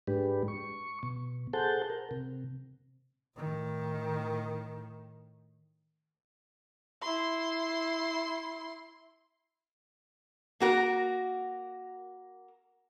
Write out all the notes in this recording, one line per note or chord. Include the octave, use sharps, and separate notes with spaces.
G#2 G#3 D4 G4 B4
C#6
B2
G#4 A4 C5 F#5 A5 G6
A#4
C3
A2 D#3
E4 C6
A#3 F#4 A#4